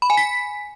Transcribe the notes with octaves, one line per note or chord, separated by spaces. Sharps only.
B5
G#5
B6